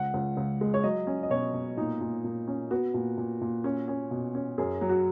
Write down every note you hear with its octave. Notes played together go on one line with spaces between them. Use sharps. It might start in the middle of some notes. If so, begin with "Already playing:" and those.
Already playing: C#2 F#5
C#2
C#2
G#3
C#5
F#3 D#5
C#4
D#5
B2 C#5
B2
A#2 D#4
A#2
A#2
C#4
B3 F#4
A#2
A#2
A#2
C#4
C#4
B2
C#4
F#2 G#4
F#3
F#4